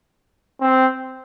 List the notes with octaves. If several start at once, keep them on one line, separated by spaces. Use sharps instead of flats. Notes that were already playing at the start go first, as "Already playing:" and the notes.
C4